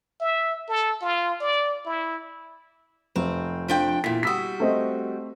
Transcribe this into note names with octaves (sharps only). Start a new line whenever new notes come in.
E5
A4
F4
D5
E4
F1 C4
F3 D4 G5
E2 A#2 B6
G3 F#4 D#6 E6 B6
A3 C4 D#5